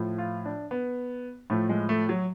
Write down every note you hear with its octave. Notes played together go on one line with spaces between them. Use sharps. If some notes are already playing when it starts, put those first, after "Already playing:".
Already playing: A2 F3
F4
D4
B3
A2 F3 A3
G#3
A3
F#3